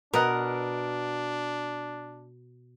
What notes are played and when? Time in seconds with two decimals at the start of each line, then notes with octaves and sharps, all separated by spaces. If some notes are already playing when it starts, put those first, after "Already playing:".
0.13 B2 D4 A#4 D#5 F#5